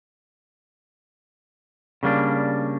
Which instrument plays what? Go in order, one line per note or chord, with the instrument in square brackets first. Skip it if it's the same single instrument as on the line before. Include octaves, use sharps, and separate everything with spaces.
[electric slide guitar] C#3 G3 A#3 D4